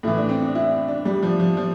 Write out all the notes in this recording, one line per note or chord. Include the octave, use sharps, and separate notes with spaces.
A2 E3 E4
D4
C4
D4
E4
D4
D4
G3
F3
F3
F3